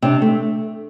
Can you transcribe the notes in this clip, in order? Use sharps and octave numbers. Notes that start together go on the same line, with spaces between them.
C3 D4
A3